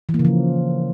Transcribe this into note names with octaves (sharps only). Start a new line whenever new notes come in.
E3
A#3
C#3
F3